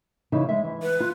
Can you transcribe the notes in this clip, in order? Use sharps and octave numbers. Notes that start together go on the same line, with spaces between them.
C#3 E3 D#4
G#3 E5
E3
B4
F4